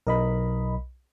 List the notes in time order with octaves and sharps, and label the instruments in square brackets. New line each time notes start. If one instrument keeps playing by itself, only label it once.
[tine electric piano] B1 [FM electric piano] A#4 D#5 B5